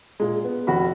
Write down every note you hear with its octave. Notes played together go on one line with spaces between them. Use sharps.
A#2 G#3
B3
F1 F#4 B5